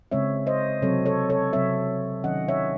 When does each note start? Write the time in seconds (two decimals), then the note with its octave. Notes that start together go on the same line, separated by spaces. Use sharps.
0.11 C#3 G#3 C4 C#5 E5
0.47 C5 D#5
0.82 C3 F#3 C4 A4 C#5
1.06 A4 C#5
1.30 A4 C#5
1.53 C3 F#3 C4 C#5 E5
2.24 D#3 F#3 C#4 D#5 F#5
2.48 C#5 E5